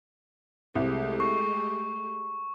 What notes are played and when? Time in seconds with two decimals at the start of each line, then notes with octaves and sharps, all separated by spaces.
0.75 C2 G#3 A3 G4
1.20 C#6 C7